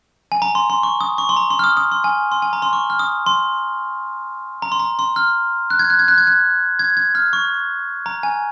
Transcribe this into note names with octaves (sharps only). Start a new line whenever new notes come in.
G#5
A#5
C6
C6
C#6
D#6
C#6
C6
A#5
C6
F6
D#6
D#6
C6
G#5
C6
G#5
A#5
C6
C#6
F6
D#6
C6
A#5
C6
A#5
C6
F6
F#6
G#6
F#6
G#6
F#6
G#6
F#6
G#6
G#6
F6
C#6
A#5
G#5